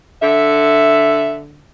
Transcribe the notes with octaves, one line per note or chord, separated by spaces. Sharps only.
D3 E5